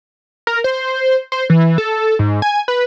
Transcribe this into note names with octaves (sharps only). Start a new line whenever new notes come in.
A#4
C5
C5
E3
A4
G#2
G#5
B4